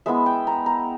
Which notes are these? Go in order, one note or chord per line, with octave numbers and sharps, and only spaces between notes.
G#3 B3 E4 E5
G5
A#5
A#5